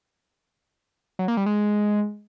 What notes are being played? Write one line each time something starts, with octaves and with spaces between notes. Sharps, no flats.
F#3
A#3
G3
G#3